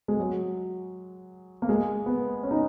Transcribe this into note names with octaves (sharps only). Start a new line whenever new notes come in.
G#3
F#3
A#3
G#3
B3
C#4
D#4